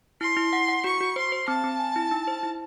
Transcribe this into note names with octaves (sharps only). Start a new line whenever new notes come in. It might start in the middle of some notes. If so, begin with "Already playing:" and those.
E4 C6
E4
F#5
F#5
F#4 C#6
F#4
C5 C6
C5
C4 A5
C4
G#5
E4
D#4
C5
E4